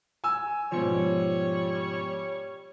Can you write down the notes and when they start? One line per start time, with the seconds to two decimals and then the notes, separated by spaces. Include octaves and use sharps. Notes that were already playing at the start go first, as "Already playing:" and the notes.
0.24 G#5 E6
0.72 G#2 B2 F3 G3 C#5